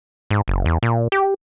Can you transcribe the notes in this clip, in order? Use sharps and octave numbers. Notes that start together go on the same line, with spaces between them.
G#2
F#1
E2
A#2
G4